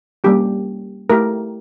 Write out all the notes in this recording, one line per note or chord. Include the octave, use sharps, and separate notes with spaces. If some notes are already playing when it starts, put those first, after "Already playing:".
G3 A#3 C#4 G4
A3 E4 G4 A#4